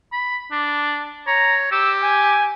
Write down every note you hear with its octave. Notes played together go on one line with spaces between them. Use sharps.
B5
D4
C#5 A#5
G4 E6
G#5